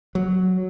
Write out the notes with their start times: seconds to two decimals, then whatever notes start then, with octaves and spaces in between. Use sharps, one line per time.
0.15 F#3